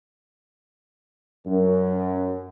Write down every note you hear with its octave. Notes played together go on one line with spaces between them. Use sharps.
F#2